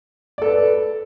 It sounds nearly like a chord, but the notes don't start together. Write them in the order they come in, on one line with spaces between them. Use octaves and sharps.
D5 A4 B4